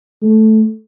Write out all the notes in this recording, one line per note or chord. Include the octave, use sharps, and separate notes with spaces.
A3